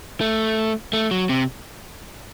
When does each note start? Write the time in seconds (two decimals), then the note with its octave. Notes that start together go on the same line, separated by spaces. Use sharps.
0.21 A3
0.93 A3
1.11 F#3
1.29 C3